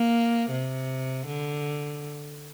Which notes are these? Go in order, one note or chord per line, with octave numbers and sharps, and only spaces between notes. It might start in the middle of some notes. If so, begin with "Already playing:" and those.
Already playing: A#3
C3
D3